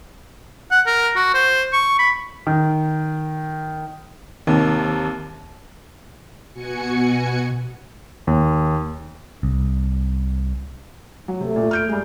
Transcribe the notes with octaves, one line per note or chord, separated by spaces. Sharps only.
F#5
A#4
F#4
C5
C#6
B5
D#3
D#2 C3 D#3
B2 F#4 G#5 C#7
D#2
C2
F#3
C3 A3
A#2
F6 G6 D7
G2 G#3